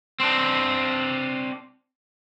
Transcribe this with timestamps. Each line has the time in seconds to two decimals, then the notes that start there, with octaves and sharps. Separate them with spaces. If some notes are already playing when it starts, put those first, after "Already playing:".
0.20 C4 D4